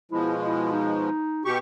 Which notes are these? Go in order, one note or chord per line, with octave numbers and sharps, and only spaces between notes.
B2 F3 G#3 E4
E4
D#4
B2 F#4 G4 C#6